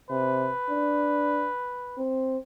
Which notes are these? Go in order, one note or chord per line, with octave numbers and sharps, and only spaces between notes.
C3 B4
D4
C4